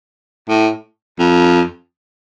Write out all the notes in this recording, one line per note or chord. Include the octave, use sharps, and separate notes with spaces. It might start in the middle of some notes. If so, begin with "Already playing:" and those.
A2
F2